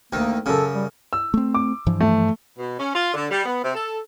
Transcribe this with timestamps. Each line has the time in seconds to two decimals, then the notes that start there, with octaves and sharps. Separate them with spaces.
0.13 D2 D#3 A#3
0.46 F#2 C#3 A4
0.75 G3
1.13 E6
1.34 A3 C4
1.54 D6
1.86 G2 E3 F3
2.01 A3
2.57 B2
2.79 C#4
2.95 F4
3.14 D3
3.31 G3
3.45 B3
3.63 C3
3.75 A4